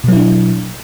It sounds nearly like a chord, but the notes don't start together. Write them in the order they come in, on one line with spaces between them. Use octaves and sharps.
B2 F#3 E4 D4